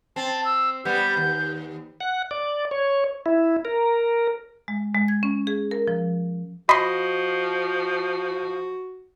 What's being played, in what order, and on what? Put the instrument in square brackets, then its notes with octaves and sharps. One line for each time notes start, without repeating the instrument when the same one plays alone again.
[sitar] C4 [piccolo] A5
[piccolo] E6
[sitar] G3 B3 [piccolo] G6
[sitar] D#2
[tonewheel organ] F#5
D5
C#5
E4
A#4
[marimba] G#3
G#3
G#6
C#4
G#4
A#4
F3
[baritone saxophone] F3 [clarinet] F#4 [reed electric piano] D#5 [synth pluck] B5 C6